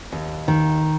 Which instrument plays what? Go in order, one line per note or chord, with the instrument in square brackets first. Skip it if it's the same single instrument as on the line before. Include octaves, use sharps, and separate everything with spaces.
[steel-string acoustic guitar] D#2
D#3